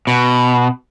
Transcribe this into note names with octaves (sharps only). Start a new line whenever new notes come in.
B2